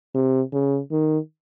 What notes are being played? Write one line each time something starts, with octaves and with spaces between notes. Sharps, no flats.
C3
C#3
D#3